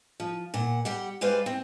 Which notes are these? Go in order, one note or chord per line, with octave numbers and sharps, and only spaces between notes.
F3
A#2 F#5
G3 G4 F#5
G3 G#3 B4 C5 D5 F5
C4